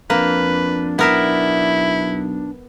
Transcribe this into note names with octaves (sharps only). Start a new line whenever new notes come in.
F2 A#3 D4 B4
B1 B3 E4 A#4 E5